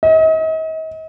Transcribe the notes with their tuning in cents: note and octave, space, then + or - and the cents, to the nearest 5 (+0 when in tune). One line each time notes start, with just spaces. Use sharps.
D#5 +40